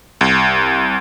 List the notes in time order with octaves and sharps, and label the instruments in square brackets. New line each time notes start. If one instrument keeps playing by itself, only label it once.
[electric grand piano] C2